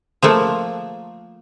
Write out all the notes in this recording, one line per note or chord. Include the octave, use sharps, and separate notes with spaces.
F3 A3 A#3